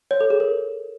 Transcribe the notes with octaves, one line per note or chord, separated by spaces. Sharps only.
C#5
A4
G#4
A#4